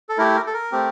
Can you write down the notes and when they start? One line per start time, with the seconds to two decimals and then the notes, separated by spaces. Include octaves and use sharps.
0.09 A4
0.18 A3 E4 G4 A#4
0.36 A#4
0.46 A4
0.54 A#4
0.72 A3 C4 G4